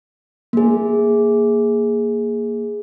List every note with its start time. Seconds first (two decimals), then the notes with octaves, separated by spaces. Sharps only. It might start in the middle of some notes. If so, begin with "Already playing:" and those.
0.53 A#3 G#4